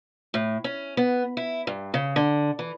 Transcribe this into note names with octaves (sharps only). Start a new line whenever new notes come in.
A2
C#4
B3
E4
G2
C#3
D3
E3